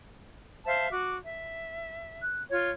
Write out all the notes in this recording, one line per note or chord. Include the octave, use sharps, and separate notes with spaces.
C5 E5 F5 A5
F#4 D6
E5
F#6
F4 C#5